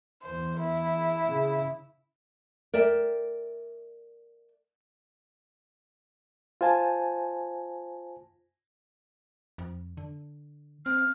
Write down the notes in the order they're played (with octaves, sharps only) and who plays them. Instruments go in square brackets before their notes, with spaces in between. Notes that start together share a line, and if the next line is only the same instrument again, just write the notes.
[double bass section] E2 [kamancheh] C5
[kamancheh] E4
[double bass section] C#3
[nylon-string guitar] A#4 D5 E5 G5
[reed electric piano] F4 C5 G#5 A5
[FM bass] F2
D3
[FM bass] C4 [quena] F6